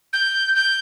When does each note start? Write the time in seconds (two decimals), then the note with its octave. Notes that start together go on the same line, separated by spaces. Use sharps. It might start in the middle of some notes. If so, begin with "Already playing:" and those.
0.13 G6
0.55 G6